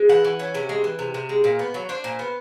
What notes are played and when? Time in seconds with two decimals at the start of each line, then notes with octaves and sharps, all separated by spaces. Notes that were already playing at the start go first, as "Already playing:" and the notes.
Already playing: G#3
0.09 E3 F#5
0.24 E3
0.39 C#4
0.55 C3
0.69 G#3
0.84 E3
0.99 C3
1.14 C3
1.29 G#3
1.44 A#2
1.59 B3
1.74 F#3
1.89 D4 C5
2.04 A#2
2.19 B3